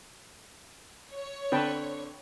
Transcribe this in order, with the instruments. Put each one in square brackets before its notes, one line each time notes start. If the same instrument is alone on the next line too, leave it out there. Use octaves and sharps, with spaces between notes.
[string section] C#5
[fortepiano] D3 C4 [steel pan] B4 G5 A5